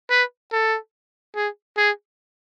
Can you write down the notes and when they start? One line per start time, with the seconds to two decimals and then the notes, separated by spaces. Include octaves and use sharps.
0.10 B4
0.52 A4
1.36 G#4
1.77 G#4